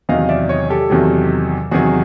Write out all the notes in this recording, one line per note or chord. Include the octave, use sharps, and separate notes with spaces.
E2 C3 D#3 F#3 D#5 F5
D5 E5
C#5 D#5
G4 A4
E2 C3 D#3 F#3
E2 C3 D#3 F#3 F#4 G#4